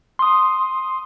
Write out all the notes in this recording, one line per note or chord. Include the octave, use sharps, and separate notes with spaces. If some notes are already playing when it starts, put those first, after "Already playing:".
C6 D#6